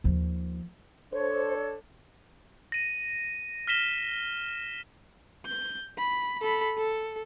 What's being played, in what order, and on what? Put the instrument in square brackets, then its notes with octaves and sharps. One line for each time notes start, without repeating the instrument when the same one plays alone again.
[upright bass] D#2 F3
[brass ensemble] D4 A4 [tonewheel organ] C5 [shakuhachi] C#5
[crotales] A#6 D#7
F6 A#6 B6 E7 G7
[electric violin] G6
B5
A4 B5
A4